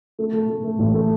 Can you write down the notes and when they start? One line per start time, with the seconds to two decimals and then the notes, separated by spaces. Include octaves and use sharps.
0.19 A3
0.33 A3
0.49 A3
0.64 A3
0.79 A1
0.94 A3